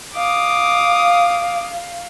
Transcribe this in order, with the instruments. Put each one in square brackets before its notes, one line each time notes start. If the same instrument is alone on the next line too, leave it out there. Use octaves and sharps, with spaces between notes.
[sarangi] F5 [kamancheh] D6 D#6